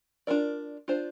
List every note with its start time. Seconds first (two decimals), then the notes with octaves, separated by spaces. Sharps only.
0.27 D4 F4 A#4 D5
0.88 D4 F4 C5